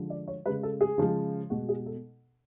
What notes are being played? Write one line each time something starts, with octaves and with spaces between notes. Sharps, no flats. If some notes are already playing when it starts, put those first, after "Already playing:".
Already playing: D3 F3 G#3
D5
C#5
C#3 G#3 B4
A4
G#4
C#3 F3 G#3
B2 G#3 F#4
G#4
A4